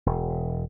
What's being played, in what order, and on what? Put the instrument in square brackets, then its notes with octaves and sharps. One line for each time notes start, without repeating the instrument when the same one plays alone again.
[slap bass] E1